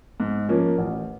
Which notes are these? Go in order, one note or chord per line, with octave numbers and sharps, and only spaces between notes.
G#2
F3 A#3 C#4
A1